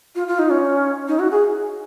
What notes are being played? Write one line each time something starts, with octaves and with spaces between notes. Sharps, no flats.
F4
F4
D#4
C#4
D#4
F#4
G#4